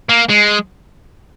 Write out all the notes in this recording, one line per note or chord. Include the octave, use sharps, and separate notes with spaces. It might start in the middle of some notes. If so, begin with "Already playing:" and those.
A#3
G#3